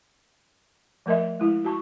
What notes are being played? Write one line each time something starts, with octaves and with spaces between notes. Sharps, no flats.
F3 A3 A#4 D#5 E5
G#3 E4
F#4 A5 C#6